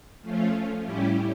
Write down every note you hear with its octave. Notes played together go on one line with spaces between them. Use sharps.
F3 A3 C#4 F4
A2 G3 C#4 E4 G4